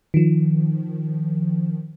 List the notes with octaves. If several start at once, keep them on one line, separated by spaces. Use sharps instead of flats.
D#3 F3